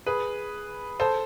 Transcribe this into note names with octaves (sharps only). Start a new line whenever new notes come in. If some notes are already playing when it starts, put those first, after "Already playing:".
G#4 B4
A4 C5